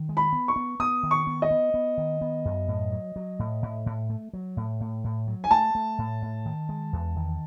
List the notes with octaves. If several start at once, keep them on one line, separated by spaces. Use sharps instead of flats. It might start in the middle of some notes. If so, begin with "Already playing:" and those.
Already playing: D#3
G#3
B5
B3
C#6
B3
B3 D#6
D#3
C#6
B3
D#5
B3
B3
D#3
B3
F#2
A2
F#3
F#3
A2
A2
A2
A3
F#3
A2
A2
A2
F#3
G#5
A3 A5
A3
A2
A2
D#3
G#3
E2
D#3